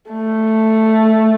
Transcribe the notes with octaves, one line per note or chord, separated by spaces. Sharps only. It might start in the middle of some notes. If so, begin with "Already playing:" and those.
A3